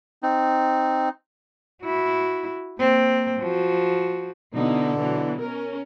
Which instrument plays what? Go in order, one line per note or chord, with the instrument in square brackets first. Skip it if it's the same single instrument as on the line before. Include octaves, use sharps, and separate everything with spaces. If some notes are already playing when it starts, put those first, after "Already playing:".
[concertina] C4 D#4
[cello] E4 F#4
A#3 C4
F3 F#4
[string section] B2 D#4 E4 [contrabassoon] D3
[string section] B2 E3 F#3
C#4 A#4